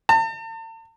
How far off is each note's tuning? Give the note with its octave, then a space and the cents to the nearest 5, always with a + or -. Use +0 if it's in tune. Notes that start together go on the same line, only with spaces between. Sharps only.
A5 +40